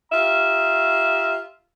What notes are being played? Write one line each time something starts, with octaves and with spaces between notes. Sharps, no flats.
F4 G4 E5 F5 A#5